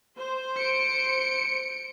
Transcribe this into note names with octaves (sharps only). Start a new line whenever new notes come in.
C5
C#7 D7